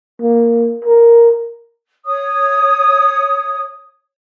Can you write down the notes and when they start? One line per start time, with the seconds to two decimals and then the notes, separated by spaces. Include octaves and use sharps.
0.21 A#3
0.85 A#4
2.06 C#5 D#6